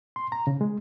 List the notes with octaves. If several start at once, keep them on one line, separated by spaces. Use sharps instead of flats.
C6
A#5
C#3
G#3